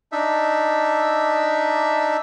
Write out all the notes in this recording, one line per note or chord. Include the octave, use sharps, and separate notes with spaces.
D4 D#4 E5